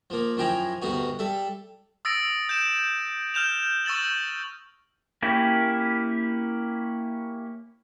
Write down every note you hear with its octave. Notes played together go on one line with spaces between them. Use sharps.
F3 A#3
F#2 F3 E4 G5 G#5 A#5
D2 G2 B3 D#4 F#4
G3 A4 E5
D#6 E6 A6 A#6 D7
G6 D7 E7
F6 G6 E7 F7
C#6 E6 A6 E7 F#7
A#3 C#4 E4 G4